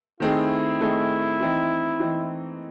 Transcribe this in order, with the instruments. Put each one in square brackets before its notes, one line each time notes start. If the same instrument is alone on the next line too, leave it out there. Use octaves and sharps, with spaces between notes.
[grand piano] D#3 A3 C4 D#4 G#4 [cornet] E4
[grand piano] D#3 A3 C4 D#4 G#4
E3 C4 D#4
E3 C4 D#4